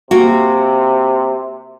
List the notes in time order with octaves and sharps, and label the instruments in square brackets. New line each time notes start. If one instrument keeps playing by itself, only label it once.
[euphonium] C3 [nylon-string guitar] A#3 F#4